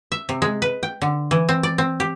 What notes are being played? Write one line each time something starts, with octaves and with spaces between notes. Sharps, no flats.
E5
C3
G#3
B4
G5
D3
E3
C4
D5
C4
G4